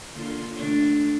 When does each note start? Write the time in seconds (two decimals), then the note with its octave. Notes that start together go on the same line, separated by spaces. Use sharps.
0.14 D3 A#3 F4
0.56 D3 A3 D4